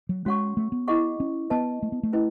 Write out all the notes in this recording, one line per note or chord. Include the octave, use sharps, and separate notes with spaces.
F#3
G#3 C#4 F#4 C#5 F#5 C#6
A3
B3
E4 G#4 D#5 F#5 C#6
C#4
B3 B4 D#5 A5
A3
B3
A3
C#4 E4 B4 D#5